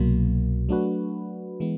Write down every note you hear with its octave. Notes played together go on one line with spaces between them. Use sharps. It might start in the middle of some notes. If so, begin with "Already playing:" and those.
Already playing: C2 B2 F#3 A#3
F#3 A3 D4 F#4 B4
E3 G#3 B3